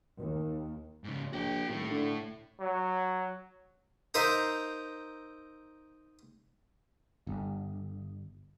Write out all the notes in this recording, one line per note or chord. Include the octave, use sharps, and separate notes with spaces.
D#2
G#2 C#3
A#1 F#4 G5
D#1 A2
D3
F#3
D#4 A#4 C5 E5 F5
G1